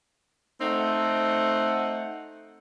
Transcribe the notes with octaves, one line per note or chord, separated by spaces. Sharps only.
A3 C4 D#4 F#5